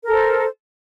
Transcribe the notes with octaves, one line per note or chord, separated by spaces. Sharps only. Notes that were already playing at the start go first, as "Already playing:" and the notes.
A4 A#4 C5